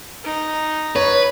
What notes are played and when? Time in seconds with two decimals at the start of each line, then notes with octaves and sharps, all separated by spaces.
0.24 D#4
0.96 B4 C#5